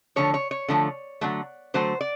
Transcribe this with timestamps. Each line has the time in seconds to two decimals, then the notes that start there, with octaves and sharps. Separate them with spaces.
0.16 D3 F3 A3 C#5
0.34 C#5
0.51 C#5
0.68 D3 F3 A3
1.21 D3 F#3 A3
1.74 D3 F#3 A3 C5
2.01 D5